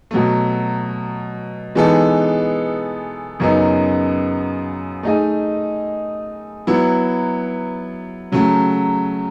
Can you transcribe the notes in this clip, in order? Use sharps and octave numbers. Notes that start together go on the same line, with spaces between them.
B2 F#3 A3
E3 G#3 B3 D#4 A4
F#2 C#3 F#3 B3 D#4
A3 D#4 G#4 D#5
F#3 B3 E4
C#3 F#3 A3